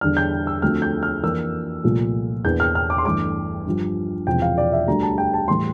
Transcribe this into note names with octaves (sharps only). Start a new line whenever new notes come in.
E2 D3 G3 D4 F6
G6
E6
D2 D3 F3 A3 C4 F6
G6
F6
F2 E3 A#3 D4 E6
C2 A#2 F3 A3
E2 E3 A#3 D4 G6
F6
F6
D6
C6
G1 G2 E3 A3 D4 D6
G1 G2 F3
E1 E2 C3 F3 C4 G5
F5
D5
E5
D2 D3 G3 A#5
A5
G5
A5
A2 E3 G3 C6